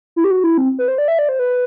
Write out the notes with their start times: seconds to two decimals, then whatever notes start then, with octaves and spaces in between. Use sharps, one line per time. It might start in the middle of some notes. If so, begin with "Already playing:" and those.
0.16 E4
0.24 G4
0.31 F#4
0.44 E4
0.58 C4
0.79 B4
0.88 C5
0.98 D5
1.08 E5
1.19 D5
1.29 C5
1.39 B4